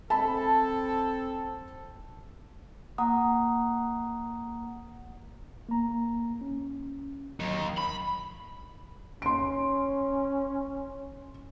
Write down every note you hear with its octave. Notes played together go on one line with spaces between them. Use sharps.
C4 A4 A5 B5
A#3 F#5 A#5 D#6
A#3 A#5
C#4
D#2 D#3 F#3
B5
C#4 C6 D7